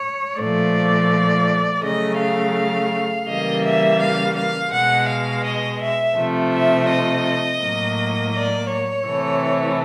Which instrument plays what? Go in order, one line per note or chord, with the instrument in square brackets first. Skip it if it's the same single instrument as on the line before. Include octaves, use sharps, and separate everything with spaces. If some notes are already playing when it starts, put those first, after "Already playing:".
Already playing: [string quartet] C#5
A#2 F3 A3 D5
C#3 F#3 A3 D#5
F5
C#3 E3 G3 A#3 D#5
E5
F5
F5
B2 G#3 F#5
F5
D#5
E5
C3 F3 A3
E5
D#5
A2 F#3 A#3
D5
C#5
C3 E3 A3